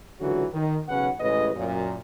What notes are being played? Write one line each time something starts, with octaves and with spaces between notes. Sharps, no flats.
C#2 D3 E3 F#3 F#4
D#3
B1 C#3 C#4 B4 F#5
A1 A2 C#3 G#3 B4 D#5
F#2 A#2